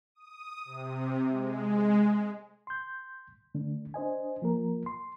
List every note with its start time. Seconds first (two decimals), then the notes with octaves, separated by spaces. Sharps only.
0.15 D#6
0.65 C3
1.29 G#3
2.67 C6 G6
3.55 D3 A3 D4
3.94 D4 C5 D#5 G#5
4.42 F3 A#3 A#4
4.86 C6